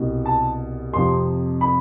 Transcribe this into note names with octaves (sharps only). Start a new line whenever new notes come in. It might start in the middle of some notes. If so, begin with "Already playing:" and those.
Already playing: C2 B2
A5
F2 C3 F3 C6
B5